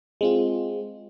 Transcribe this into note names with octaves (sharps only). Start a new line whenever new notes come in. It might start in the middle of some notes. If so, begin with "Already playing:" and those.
G#3 C4 F4